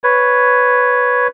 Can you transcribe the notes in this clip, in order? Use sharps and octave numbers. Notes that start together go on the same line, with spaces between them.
B4 C#5